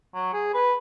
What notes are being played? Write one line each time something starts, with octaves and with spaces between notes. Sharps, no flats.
F#3
G#4
B4